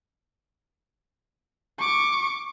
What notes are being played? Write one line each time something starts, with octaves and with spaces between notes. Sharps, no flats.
C#6 D6